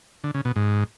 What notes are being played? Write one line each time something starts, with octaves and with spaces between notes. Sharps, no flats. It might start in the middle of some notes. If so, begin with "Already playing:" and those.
D3
C#3
B2
G#2